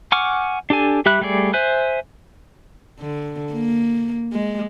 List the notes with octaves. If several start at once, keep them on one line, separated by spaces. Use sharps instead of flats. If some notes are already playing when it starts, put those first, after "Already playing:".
F#5 G#5 C#6 D6 F6
D4 G4 A4 G#5
G3 G4 E5 B5 F#6
G3 A3 G#4 D5
C5 E5 G#5 F#6
D3
A#3
G#3